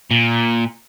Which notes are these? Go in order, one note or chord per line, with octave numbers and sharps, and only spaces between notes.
A#2